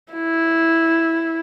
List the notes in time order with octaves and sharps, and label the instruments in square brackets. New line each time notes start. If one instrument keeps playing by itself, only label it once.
[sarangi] E4